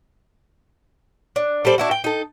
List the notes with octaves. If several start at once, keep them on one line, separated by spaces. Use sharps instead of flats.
D4
G3 A4 C5 D5
D4 E4 F#4
G5
D#4 A4